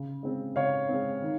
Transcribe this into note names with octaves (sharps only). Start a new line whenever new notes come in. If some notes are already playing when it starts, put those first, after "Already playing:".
Already playing: C#3
G#3 C4
C#3 C#5 F5
G#3 C4
D#3